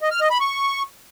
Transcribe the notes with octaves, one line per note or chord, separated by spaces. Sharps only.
D#5
F6
D#5
B5
C#6